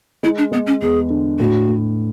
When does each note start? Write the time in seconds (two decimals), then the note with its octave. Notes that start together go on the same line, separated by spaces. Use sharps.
0.23 G#3 E4
0.38 D4
0.52 G#3 B3
0.66 C#4
0.82 E2 G#4
1.10 D3
1.39 A2 F#4
1.69 A2